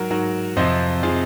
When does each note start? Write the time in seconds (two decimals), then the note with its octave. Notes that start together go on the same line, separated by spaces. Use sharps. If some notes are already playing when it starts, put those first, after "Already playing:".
Already playing: G#2 F#3 F#4 A#4
0.10 G#2 F#3 F#4 A#4
0.56 F2 C3 F3 C5 D#5
1.03 C3 F3 F4 G#4